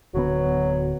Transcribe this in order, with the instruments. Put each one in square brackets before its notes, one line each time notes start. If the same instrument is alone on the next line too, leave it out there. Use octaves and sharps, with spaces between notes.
[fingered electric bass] D1 D3 B3 [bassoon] F#3